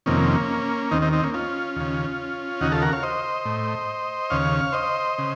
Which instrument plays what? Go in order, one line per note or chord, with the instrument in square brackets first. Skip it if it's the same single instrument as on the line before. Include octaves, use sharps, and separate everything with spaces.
[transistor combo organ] F2 C3 D#3 A#3 C#4
D#2 D#3 C4 D#4
C4 D#4
C4 D#4
A#3 C#4
C#4 F4
D#2 C#3
D#2 C#3 D#4 F#4
F4 A4
F#4 A#4
C#5 F5
C5 D#5
A2
D#2 C#3 C#5 F5
C5 D#5
C#3